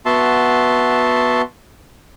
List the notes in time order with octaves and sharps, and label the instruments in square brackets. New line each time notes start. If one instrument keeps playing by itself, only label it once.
[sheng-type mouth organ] B3 F#4 E5 A5 C6